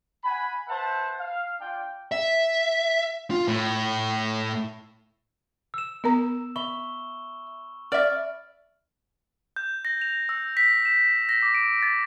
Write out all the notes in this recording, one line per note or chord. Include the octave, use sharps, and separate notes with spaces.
F#5 G#5 B5
B4 C5 E5 F#5 A5
F5
D4 F4 G5
E5
F4
A2
E6 E7
B3 A#4 A#5
E5 B5 C#6 G7
D5 E5 F6
G6
A#6
F7
E6
B6
E7
A#6
D6
D7
A6